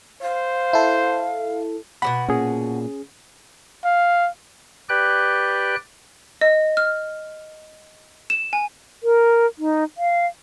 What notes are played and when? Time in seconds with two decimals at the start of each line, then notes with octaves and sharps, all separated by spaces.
0.22 C5 F5
0.73 E4 A4
2.02 B2 F#3 F#5 B5
2.29 A#2 C#4 G#4
3.84 F5
4.89 G4 B4 D5 G5 F#6
6.41 D#5
6.77 F6
8.30 E7
8.53 G#5
9.03 A#4
9.58 D#4
9.97 F5